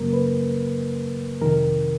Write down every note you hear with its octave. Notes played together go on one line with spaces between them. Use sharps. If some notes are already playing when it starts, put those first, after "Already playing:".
Already playing: F#2 C#3 F#3 A#3 A#4
B4
F2 C3 D#3 A#4